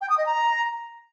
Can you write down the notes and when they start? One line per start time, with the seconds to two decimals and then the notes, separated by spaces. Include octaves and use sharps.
0.01 G5
0.09 D#6
0.18 D#5
0.26 A#5